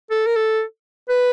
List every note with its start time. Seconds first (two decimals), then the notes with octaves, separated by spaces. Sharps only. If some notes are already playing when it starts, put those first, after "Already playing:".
0.11 A4
0.26 A#4
0.36 A4
1.09 B4